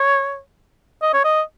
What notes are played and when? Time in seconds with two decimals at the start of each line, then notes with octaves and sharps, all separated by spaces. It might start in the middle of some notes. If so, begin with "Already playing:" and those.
Already playing: C#5
1.02 D#5
1.13 C#5
1.24 D#5